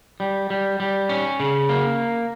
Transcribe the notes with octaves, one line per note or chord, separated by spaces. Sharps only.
G3
G3
G3
C#4
C#3
A#3